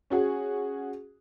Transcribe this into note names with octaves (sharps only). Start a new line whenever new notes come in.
C#4 F#4 G#4